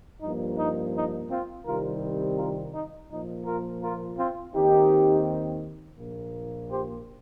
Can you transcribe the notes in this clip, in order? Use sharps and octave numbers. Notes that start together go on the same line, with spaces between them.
G2 F3 A#3 D#4
D#4
D#4
C4 F4
C2 C3 D#3 G3 C4 F4 A#4
F4 A#4
D#4
A#2 F3 A#3 D#4
F4 A#4
F4 A#4
C4 F4
D#2 D#3 C4 D#4 G4
A#1 A#2 A#3
G4 C5